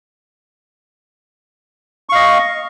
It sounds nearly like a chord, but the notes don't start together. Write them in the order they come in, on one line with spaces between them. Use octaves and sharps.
C#6 F5 D#5